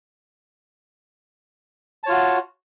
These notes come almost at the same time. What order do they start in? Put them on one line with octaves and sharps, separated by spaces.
A5 C#5 F4 F#4